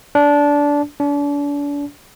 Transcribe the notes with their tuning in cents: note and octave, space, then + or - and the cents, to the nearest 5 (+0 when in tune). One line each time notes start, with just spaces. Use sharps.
D4 -20
D4 -40